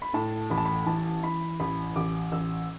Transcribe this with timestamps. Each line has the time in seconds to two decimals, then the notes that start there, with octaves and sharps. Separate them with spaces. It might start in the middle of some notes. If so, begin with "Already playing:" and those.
0.02 B5
0.14 A2 A5
0.50 A1 B5
0.58 A5
0.65 B5
0.86 E3 A5
1.23 E3 B5
1.60 A1 B5
1.96 A1 D6
2.32 A1 E6